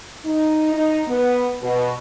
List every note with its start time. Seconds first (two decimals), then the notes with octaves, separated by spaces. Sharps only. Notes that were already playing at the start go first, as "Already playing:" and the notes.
0.25 D#4
0.74 D#4
1.07 B3
1.63 B2